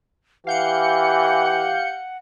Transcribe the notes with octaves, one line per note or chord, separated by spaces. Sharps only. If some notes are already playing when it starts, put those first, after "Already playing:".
E3 G4 F5 F#5 G6 C#7